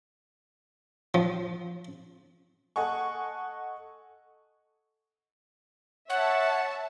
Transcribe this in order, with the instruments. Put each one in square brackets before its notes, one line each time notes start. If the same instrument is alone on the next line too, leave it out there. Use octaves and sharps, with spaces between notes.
[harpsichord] F3
[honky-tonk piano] A4 D#5 F#5 G#5 C#6
[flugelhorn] C#5 [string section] E5 A5 [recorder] F#5